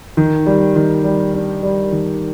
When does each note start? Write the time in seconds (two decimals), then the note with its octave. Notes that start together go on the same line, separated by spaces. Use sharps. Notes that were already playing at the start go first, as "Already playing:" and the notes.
0.17 D#3
0.46 G3
0.76 D#3
1.04 G3
1.34 D4
1.63 G3
1.92 D#3